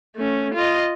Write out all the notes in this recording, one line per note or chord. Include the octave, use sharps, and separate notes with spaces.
A3 C#4
F4 D#5